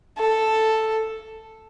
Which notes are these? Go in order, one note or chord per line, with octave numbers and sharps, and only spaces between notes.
A4